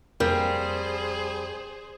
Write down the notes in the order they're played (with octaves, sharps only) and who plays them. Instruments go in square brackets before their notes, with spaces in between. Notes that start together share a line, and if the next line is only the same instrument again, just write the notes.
[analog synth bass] F2 [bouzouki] G3 [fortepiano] A#3 [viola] G#4 C5